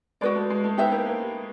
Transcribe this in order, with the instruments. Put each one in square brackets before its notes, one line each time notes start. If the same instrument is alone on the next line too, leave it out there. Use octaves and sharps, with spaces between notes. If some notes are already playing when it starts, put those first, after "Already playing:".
[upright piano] G#3 [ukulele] F#4 B4 D5
[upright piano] A3
G#3
A3
[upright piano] B3 [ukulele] D#4 G4 C5 E5
[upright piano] A#3
A#3